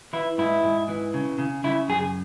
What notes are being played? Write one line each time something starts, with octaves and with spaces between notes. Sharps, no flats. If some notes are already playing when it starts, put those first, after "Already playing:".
E3 E4
G#2 E4
G#2
E3
C#3
C#3
C#3 E4
F#2 G#4